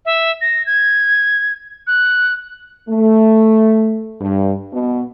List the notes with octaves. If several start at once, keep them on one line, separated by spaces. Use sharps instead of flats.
E5
A#6
G#6
F#6
A3
G2
B2